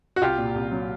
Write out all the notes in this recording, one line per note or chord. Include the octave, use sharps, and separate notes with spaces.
F#4
C2 F4 G4
A#2
C2
F#3